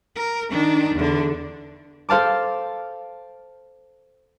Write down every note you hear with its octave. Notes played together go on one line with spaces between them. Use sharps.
A#4
D#3 D4
E2 D3
A4 C5 F5 A5 D6